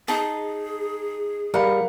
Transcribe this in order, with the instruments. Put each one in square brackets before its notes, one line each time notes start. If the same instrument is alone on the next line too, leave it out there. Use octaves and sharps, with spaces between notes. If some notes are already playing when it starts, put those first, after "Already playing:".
[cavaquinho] D#4 A5 [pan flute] G#4
[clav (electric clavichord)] G3 [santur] A#4 F5 B5 [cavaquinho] F#5